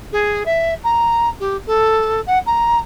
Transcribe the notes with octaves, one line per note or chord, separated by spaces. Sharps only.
G#4
E5
A#5
G4
A4
F#5
A#5